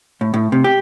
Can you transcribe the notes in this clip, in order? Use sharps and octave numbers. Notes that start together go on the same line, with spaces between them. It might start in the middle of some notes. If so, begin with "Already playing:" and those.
A2
A2
C3
G4